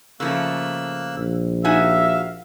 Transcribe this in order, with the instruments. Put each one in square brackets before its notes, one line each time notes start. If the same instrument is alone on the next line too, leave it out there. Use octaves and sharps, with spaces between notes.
[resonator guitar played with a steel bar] C#3 F3 A3 [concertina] A#3 E6 F#6
[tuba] A#1
[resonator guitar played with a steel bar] D#4 F#4 G#5 [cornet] E5 [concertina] F5